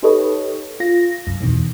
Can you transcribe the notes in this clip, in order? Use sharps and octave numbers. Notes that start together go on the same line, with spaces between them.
D#4 G4 A4 B4 C#5 D#5
F4 A#6
C2 F#2
E2 B2 D#3 E3